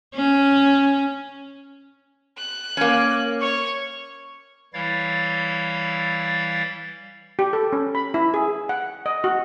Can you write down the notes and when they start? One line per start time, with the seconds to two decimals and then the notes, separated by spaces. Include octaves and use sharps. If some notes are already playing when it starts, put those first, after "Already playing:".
0.14 C#4
2.38 F#6
2.77 A#3 C#4
3.42 C#5 C#6
4.74 E3 G3 E4 C#5 F5 A6
7.39 G4
7.53 A4
7.73 C#4
7.95 B5
8.14 E4
8.34 G#4
8.69 F#5
9.06 D#5
9.24 F#4